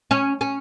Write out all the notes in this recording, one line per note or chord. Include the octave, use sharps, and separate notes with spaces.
C#4
C#4